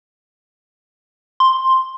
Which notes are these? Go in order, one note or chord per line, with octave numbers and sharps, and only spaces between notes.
C6